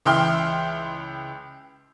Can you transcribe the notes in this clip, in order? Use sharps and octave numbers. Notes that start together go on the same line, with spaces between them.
C#2 E3 E5 G5 C6 F6